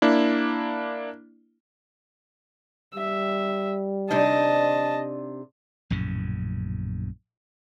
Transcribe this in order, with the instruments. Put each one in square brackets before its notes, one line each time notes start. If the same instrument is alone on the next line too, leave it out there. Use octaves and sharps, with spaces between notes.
[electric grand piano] A#3 D4 E4
[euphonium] G3 [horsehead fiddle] E5
[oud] C3 D4 D#4 [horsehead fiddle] D#5 A5
[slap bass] A#1 F#2 A2 C#3